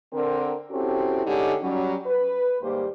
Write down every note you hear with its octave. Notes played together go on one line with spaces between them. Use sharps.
D3 C4 A#4
C4 C#4 E4 F#4 G4 A4
D3 G#3 C#4 D#4 G4
F#3 G3 C#4
B4
D#2 G#2 G3 A#3 G4 C5